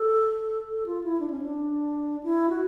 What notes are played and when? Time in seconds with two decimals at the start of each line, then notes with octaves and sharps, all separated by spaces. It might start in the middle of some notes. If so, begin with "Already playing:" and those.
Already playing: A4
0.69 A4
0.86 F4
1.04 E4
1.20 D4
1.30 C#4
1.42 D4
2.23 E4
2.50 F#4